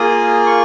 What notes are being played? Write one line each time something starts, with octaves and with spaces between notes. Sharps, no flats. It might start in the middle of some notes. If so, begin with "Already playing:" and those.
Already playing: A#3 F4 G#4 D#6
C#6